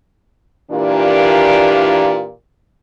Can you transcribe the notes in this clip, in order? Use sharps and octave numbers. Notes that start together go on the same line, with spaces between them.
A#2 E3 A#3 D4 F4 G4